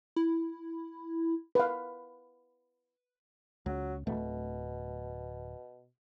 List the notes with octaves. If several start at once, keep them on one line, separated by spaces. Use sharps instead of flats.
E4
B4 F5
C#2 F#3
D1 B2 A3